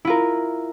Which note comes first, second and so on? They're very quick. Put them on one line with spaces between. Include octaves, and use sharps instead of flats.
E4 F4 A#4